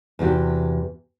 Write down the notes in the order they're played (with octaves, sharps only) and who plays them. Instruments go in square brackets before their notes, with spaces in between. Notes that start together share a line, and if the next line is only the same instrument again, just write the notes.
[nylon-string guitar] E2 C3 F#4 G4